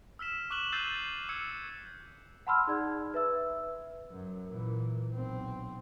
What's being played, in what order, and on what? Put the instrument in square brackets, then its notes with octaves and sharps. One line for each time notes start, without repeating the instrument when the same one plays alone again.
[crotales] E6 F6 B6 E7
C#6 D6 F#6 E7 F#7 G7
E6 G6 A6 C7 D#7
E6 G#6 C#7
[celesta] F#5 A5 B5 C6 E6 F6
D#4 G#4 D5 G#6
B4 E5 E6
[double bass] F#2
A#2 E3
B1 C4